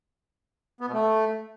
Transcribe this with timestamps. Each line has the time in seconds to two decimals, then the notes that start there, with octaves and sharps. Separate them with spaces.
0.81 B3
0.87 B2
0.94 A3